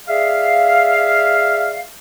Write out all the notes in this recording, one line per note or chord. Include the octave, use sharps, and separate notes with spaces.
G#4 D5 E5 F5